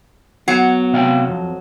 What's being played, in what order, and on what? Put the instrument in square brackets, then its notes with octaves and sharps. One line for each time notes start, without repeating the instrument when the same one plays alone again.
[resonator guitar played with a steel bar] F#3 [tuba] B3 [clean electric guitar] F#5
[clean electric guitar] C3 F5 G5
F2